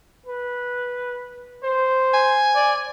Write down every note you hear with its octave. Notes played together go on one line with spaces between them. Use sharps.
B4
C5
G#5
D5